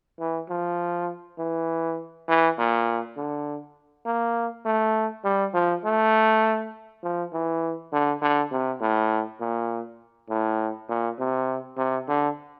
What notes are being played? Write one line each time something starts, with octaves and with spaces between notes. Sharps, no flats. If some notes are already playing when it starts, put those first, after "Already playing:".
E3
F3
E3
E3
A#2
D3
A#3
A3
G3
F3
A3
F3
E3
D3
D3
C3
A2
A#2
A2
A#2
C3
C3
D3